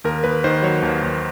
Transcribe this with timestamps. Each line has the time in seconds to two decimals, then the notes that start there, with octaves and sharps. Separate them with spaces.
0.04 D#2 A#4
0.24 D#2 B4
0.44 D#3 C5
0.63 F#3 C#5
0.82 D#2
1.03 D#2